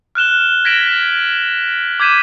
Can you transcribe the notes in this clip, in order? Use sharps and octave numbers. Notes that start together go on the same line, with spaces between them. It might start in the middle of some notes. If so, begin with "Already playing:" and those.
F6 F#6 E7 G7
G#6 A#6 B6 D7 E7 F#7
D6 G6 G#6 B6 D#7 E7